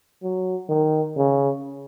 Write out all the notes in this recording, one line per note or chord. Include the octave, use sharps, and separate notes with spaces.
F#3
D#3
C#3